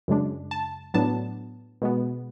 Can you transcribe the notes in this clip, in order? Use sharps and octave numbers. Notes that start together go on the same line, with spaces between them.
F#2 C#3 G#3 D4
A5
A2 F#3 B3 D4 A5
B2 G#3 B3